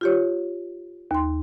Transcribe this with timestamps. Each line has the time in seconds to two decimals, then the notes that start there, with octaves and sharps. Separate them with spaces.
0.01 F4 G4 C#5
1.11 D#2 C6